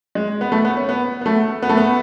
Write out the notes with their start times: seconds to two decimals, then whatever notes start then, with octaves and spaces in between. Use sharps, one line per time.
0.15 G#3
0.41 B3
0.52 A3
0.65 B3
0.77 C#4
0.89 B3
1.21 B3
1.26 A3
1.62 B3
1.69 A3
1.77 B3